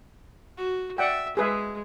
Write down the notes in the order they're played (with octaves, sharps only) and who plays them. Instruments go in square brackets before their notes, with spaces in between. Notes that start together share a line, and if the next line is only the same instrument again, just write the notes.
[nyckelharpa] F#4
[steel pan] D5 F#5 G5 [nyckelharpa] E5
[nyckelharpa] G#3 [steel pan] G#4 B4 E5